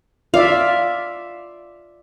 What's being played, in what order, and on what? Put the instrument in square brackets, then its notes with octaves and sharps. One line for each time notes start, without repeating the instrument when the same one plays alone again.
[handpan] F4 D5 E5 [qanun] F5